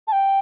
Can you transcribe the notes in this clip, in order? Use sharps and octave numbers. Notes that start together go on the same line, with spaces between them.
A5
G5